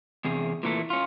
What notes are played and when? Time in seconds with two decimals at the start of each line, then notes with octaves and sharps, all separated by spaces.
0.24 E2 C3 G#4
0.63 A#2 E3 A3
0.90 C#4 F4